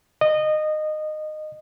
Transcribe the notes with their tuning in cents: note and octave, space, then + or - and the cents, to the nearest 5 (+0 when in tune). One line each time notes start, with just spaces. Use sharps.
D#5 -20